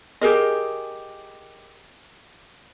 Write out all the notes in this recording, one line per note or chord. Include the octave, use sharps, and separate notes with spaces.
G4 G#4 A#4 D#5